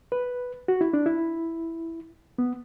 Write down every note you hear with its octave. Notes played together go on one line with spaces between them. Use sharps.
B4
F#4
E4
D4
E4
B3